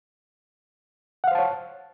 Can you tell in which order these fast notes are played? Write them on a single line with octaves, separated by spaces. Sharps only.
F#5 F5 C5 A5 C#5